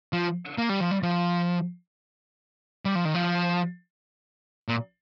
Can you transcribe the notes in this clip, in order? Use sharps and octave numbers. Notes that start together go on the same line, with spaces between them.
F3
A#3
G3
F3
G3
F3
G3
F3
D#3
F3
A#2